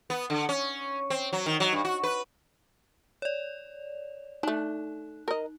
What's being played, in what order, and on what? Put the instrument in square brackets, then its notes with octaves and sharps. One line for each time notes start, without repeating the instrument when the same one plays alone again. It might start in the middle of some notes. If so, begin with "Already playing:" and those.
[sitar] B3
D3
C#4
C4
F#3
D#3
F#3
G2
F#4
B4
[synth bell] C#5 D5
[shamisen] A3 D4 [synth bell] D#4
[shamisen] A#4 D#5